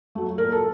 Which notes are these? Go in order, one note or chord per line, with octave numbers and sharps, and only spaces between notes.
F#3 A3
A#2 A#4
A4